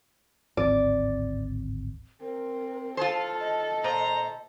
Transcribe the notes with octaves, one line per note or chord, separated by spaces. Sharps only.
D1 G#1 C4 D5
C4 A#4
F4 A4 C5 A5
D#5
A#2 C5 A#5